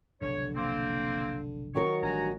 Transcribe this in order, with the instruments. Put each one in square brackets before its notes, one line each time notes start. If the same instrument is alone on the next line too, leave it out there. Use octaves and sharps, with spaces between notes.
[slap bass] F1 B1 G#2 [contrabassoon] D3 [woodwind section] C#5
[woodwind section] A#3 C4
[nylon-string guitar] D#3 F#3 A#4 [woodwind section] C#6
[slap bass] A1 [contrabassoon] G2 [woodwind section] F#4 G#5 A#5